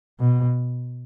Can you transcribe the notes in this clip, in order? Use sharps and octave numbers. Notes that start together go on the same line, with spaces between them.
B2